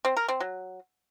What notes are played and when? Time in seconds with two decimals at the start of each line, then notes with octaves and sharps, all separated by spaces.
0.05 C4
0.17 A#4
0.28 C4
0.40 F#3